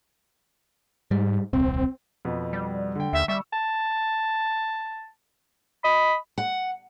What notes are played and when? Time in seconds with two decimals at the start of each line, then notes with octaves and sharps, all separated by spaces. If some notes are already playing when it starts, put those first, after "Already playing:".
1.11 G#2 G3
1.53 D#1 C2 C4
2.25 F2 B2 B3
2.53 G3
2.95 D3 G5
3.13 D#2 E5
3.28 G3 E5 C#6 E6
3.53 A5
5.84 D#5 B5
6.38 F#5